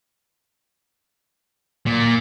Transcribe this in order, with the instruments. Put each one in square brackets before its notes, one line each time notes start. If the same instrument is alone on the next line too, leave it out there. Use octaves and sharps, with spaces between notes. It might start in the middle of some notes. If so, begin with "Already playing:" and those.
[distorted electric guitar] A#2